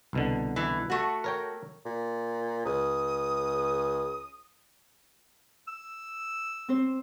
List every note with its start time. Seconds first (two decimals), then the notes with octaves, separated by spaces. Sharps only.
0.13 C2 B2 D3
0.56 E3
0.90 A3 F#4
1.24 A#4 C#5 G5
1.86 A#2
2.65 C#2 D#6
5.68 E6
6.69 C4 C5